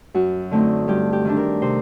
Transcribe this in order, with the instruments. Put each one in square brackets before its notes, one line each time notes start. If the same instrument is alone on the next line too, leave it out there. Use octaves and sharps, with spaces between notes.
[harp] F#2 F#4
D3 A3 C4 D#4
G2 G4
G4
D#3 A3 D4
A#4
C3 C5